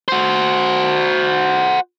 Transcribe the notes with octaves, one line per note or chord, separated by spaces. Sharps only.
F#4 C5